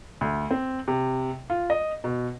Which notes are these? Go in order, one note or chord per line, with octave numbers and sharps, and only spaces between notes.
D2
C4
C3
F4
D#5
B2